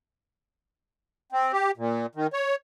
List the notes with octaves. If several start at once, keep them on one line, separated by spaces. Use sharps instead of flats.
C4
G4
A#2
D#3
C#5